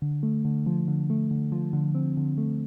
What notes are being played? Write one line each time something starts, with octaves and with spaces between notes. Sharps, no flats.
D3
A3
D3
F3
D3
A3
D3
F3
D3
C4
D3
A3